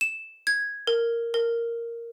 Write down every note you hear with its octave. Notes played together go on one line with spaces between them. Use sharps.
E7
G#6
A#4
A#4